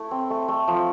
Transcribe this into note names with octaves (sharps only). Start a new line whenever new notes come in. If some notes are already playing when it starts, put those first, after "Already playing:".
Already playing: A3 E4
C4
A3
A3
F3